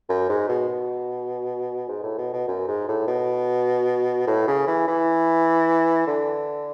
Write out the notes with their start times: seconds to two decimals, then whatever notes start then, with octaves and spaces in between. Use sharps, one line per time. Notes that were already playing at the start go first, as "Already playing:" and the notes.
0.10 F#2
0.29 G#2
0.49 B2
0.68 B2
1.88 G#2
2.03 A2
2.18 B2
2.33 B2
2.48 F#2
2.68 G#2
2.89 A2
3.08 B2
4.27 A2
4.48 C#3
4.67 E3
4.88 E3
6.07 D3